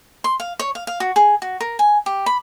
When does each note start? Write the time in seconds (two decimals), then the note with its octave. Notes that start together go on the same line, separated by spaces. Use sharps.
0.24 C6
0.40 F5
0.59 C#5
0.75 F5
0.87 F5
1.00 F#4
1.16 G#4
1.42 F#4
1.60 A#4
1.79 G#5
2.06 G4
2.26 B5